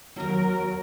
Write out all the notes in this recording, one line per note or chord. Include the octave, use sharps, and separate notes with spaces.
D#2 F#3 A#3 A#4